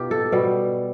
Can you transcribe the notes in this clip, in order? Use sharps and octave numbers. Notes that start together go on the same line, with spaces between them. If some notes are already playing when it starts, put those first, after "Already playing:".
Already playing: B2 D#4 F4 G4
A4
B2 G3